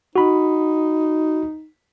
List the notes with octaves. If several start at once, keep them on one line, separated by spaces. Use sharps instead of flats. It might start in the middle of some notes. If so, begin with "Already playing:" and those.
D#4 F#4 B5